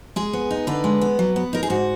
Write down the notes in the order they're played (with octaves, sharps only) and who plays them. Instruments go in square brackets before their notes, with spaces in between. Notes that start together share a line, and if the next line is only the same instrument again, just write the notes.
[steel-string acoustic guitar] G#3 G#4
B3
D#4
D3 B4
G#3
B3
F#3
B3
D#4 A#4
G#4
G#2 F#4